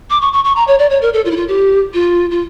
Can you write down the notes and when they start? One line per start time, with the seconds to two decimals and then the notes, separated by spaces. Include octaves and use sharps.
0.10 D6
0.22 C#6
0.33 C#6
0.45 C#6
0.56 A#5
0.68 C#5
0.79 D5
0.90 C#5
1.02 A#4
1.13 A4
1.25 F4
1.31 E4
1.36 F4
1.48 G4
1.94 F4
2.31 F4